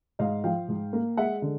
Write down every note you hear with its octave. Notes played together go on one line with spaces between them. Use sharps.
G#2 D#5 F5
F3 F5 G5
G#2
A#3
G#3 E5 F#5
D3